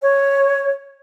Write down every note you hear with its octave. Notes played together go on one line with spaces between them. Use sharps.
C#5